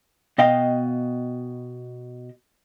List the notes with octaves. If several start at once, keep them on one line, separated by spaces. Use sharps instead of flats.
B2 D#5 F5 G5